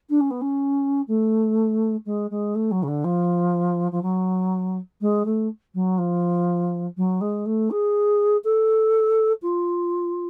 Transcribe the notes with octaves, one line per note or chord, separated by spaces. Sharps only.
D4
C#4
B3
C#4
A3
G#3
G#3
A3
F#3
C#3
D3
F3
F3
F#3
G#3
A3
F#3
F3
F#3
G#3
A3
G#4
A4
F4